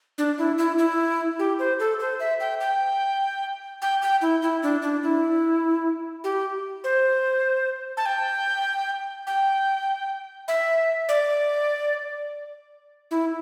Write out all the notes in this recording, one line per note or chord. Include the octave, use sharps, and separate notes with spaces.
D4
E4
E4
E4
G4
C5
A4
C5
E5
G5
G5
G5
G5
E4
E4
D4
D4
E4
G4
C5
A5
G5
G5
E5
D5
E4